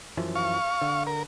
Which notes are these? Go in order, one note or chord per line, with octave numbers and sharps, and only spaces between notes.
F#2 E3 F3
F5 C#6
D3
A#4